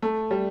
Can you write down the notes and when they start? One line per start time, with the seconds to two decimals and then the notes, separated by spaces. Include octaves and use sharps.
0.02 A3
0.31 G3